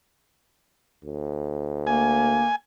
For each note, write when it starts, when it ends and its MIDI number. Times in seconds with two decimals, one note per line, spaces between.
1.04 2.45 38
1.87 2.51 58
1.87 2.56 80